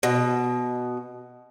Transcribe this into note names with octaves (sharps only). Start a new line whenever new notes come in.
B2